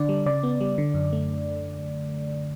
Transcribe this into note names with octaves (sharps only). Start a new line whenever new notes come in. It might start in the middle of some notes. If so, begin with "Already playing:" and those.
Already playing: D3 D4 D5
G3
C#3 D5
B3
G3
D3
F#2
A3